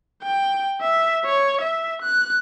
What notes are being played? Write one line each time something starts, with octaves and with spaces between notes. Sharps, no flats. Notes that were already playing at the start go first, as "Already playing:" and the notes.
G5
E5
C#5
E5
F#6